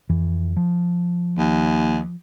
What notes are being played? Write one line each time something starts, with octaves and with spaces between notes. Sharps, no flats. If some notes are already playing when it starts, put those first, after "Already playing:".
F2 E3
F3
D#2